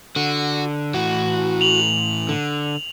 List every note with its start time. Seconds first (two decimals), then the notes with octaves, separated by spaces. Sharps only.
0.16 D3 F#4
0.94 A2 E3 F#4
1.61 F7 F#7
2.29 D3